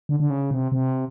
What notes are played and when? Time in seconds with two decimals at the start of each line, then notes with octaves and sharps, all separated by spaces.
0.09 D3
0.20 D3
0.30 C#3
0.51 C3
0.72 C3